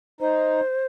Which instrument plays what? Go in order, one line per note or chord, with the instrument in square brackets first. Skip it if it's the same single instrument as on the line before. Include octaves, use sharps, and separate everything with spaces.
[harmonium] D#4 [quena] C5